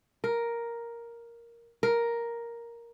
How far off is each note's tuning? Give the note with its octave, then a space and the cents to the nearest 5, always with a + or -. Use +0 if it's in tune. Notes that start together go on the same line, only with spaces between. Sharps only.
A#4 +5
A#4 +5